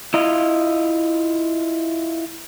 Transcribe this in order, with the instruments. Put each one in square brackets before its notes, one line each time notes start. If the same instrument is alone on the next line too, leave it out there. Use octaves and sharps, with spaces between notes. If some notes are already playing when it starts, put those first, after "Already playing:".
[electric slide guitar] E4 F4 D#5